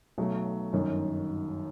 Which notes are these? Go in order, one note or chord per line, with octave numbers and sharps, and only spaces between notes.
B1 B2 F#3 A3
G1 F#2 D#3